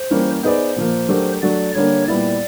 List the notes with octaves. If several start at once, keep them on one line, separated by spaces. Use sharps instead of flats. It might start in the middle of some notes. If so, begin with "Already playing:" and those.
Already playing: C5
E3 G3 A#3 C#4
B3 D#4 G#4 B4 C5 D5
A#2 F3 A#3
F#3 A3 D4 G4 A#4
F#3 A3 D4 F#4 D5
D3 G3 A#3 D4 C#5
A#2 G3 B3 E4 D5